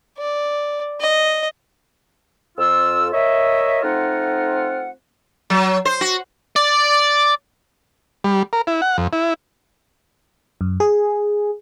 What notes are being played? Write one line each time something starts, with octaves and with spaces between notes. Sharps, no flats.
D5
D#5
F2 F4 E6
A#4 C#5 D#5 E5
A3 C4 D#4 F4 F#5
F#3
C5
F#4
D5
G3
A#4
E4
F#5
F2
E4
F#2
G#4